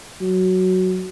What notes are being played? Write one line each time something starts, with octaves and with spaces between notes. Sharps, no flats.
F#3